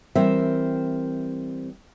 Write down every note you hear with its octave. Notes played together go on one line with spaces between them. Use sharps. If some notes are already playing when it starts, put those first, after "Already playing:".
E3 G3 C4 A#4 C5 E5